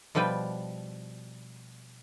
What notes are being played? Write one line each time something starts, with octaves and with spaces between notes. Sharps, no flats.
B2 F3 G3 B4 G5